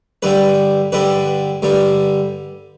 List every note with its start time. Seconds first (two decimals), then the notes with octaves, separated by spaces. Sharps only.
0.22 G2 D3 G3 B4
0.92 G2 D3 G3 B4
1.62 G2 D3 G3